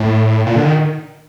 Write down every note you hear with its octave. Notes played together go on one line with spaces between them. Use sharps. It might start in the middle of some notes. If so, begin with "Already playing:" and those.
Already playing: A2
A#2
D3
D#3